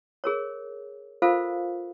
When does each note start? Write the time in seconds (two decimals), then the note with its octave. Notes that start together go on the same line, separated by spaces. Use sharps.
0.24 G#4 A#4 C#5
1.22 F4 A4 A#4 C5 F5